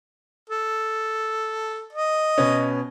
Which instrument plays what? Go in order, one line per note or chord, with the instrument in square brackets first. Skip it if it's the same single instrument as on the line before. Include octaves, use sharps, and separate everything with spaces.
[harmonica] A4
D#5
[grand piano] B2 B3 C#4